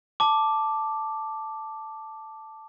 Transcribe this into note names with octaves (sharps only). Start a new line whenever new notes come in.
A5 D6